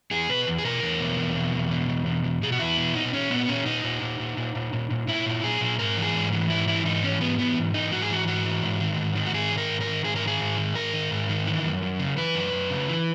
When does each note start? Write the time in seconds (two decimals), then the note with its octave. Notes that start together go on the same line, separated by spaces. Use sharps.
0.11 E2 G#4
0.29 B2 B4
0.47 E2
0.58 G#4
0.65 B2 A#4
0.82 E2
1.00 B2
1.18 E2
1.36 B2
1.54 E2
1.71 B2
1.88 E2
2.06 B2
2.24 E2
2.42 B2 G#4
2.52 F#4
2.59 E2 E4
2.77 B2
2.95 A#2 D#4
3.13 A#2 C#4
3.31 A#2 B3
3.49 A#2 C#4
3.66 A#2 D#4
3.84 A#2
4.02 A#2
4.20 A#2
4.37 A#2
4.55 A#2
4.73 A#2
4.90 A#2
5.07 A#2 E4
5.26 A#2
5.43 A#2 G#4
5.61 A#2
5.79 G#2 A#4
5.97 E3
6.02 G#4
6.14 G#2
6.32 E3
6.50 G#2 E4
6.68 E3 E4
6.85 G#2 D#4
7.03 E3 C#4
7.20 G#2 B3
7.39 E3 B3
7.57 G#2
7.74 E3 D#4
7.92 G#2 F#4
8.02 G#4
8.10 E3 F#4
8.27 G#2 F#4
8.45 E3
8.63 G#2
8.80 D#3
8.98 G#2
9.16 D#3
9.26 F#4
9.33 G#2 G#4
9.52 D#3
9.58 A#4
9.69 G#2
9.81 A#4
9.87 D#3
10.04 G#2 G#4
10.16 A#4
10.23 D#3 G#4
10.40 G#2
10.58 D#3
10.75 G#2 A#4
10.94 D#3
11.11 G#2
11.29 D#3
11.46 E3
11.64 F#2
11.82 F#2
12.00 C#3
12.17 E3 B4
12.35 F#2
12.52 F#2
12.70 C#3
12.88 E3